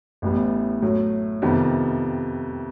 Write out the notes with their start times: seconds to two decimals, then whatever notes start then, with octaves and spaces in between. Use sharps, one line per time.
0.22 A1 A2 E3 G3 B3
0.82 A2 F#3 A3
1.42 F2 C3 D#3 G3 B3